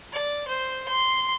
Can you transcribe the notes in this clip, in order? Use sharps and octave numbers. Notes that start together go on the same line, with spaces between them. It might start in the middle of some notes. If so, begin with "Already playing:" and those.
D5
C5
C6